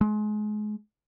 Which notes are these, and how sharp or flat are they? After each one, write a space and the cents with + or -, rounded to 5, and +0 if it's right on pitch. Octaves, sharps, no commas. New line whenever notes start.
G#3 +30